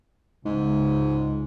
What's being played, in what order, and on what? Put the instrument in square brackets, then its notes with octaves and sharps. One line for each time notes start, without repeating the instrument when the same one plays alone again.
[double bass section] C#2 [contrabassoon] G#2